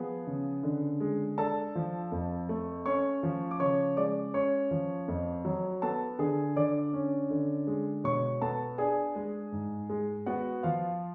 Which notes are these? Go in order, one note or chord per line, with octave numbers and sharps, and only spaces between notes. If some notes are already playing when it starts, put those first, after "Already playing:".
Already playing: F3 B3 G#4
C#3
D3
G#3
D4 A4 A5
F3
F2
A3
C#4 C#5 C#6
F3
D6
C#3 C#5 C#6
G#3 D5 D6
C#4 C#5 C#6
F3
F2
F#3
B3 A4 A5
D3 G#4 G#5
D3 D5 D6
C#4
D3
G#3
B2 C#5 C#6
B3 A4 A5
D4 G#4 G#5
G#3
G#2
G#3
B3 F#4 F#5
F3 F4 F5